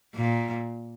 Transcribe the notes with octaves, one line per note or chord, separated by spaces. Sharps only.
A#2